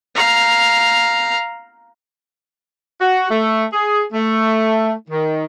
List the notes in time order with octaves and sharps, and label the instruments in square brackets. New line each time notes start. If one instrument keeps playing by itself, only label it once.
[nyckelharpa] F5 A#5
[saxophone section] F#4
A3
G#4
A3
D#3